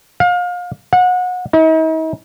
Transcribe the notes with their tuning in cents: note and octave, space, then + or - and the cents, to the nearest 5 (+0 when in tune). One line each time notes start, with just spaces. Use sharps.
F5 +30
F#5 -30
D#4 +45